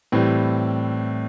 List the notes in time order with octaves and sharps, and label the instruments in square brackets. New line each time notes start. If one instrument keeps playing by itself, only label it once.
[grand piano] A2 E3 G3 C4